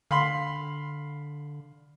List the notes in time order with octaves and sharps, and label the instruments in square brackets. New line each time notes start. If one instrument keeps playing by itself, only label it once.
[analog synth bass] D3 [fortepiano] F5 B5 C6